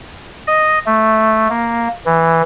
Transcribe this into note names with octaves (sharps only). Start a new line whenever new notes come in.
D#5
A3
A#3
E3